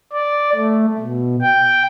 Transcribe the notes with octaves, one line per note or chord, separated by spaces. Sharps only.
D5
A3
B2
G5